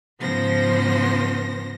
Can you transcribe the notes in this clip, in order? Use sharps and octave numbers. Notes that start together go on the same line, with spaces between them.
G#2 C#3 F3 B3 C5 A#6